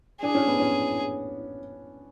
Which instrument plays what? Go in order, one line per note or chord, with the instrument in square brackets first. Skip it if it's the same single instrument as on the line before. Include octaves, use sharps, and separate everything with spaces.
[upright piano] D4 [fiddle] G#4
[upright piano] C#4
B3
C#4